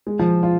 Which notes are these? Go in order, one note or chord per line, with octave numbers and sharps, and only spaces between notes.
G#3
F3
F4